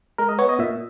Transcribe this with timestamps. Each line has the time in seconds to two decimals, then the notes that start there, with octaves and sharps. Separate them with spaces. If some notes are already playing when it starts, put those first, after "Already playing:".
0.18 G#3 A#4
0.29 D#5
0.39 B3 C#5
0.49 D#5
0.59 A#2 E5